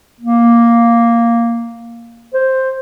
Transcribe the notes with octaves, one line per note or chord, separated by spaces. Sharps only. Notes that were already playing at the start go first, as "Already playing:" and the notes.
A#3
C5